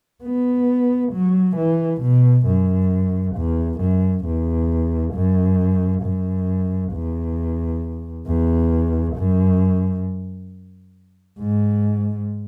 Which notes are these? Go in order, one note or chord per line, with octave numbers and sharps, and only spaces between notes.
B3
F#3
E3
B2
F#2
E2
F#2
E2
F#2
F#2
E2
E2
F#2
G#2